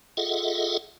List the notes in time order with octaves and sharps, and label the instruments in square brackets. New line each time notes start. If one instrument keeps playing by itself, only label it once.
[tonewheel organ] F4 G#4 A4 D#5 E5 F#5